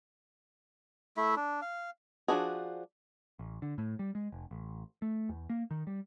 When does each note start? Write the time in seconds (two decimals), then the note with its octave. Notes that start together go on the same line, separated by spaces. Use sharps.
1.17 A3 E4 E5
1.37 D4
1.62 F5
2.28 F3 G#3 D4 F#4 G#4
3.39 A1
3.62 D3
3.78 A2
3.99 G3
4.15 G#3
4.32 F1
4.51 A1
5.02 A3
5.29 E2
5.50 A#3
5.71 D#3
5.87 G3